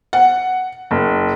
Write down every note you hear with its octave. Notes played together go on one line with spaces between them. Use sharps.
F#5
F#1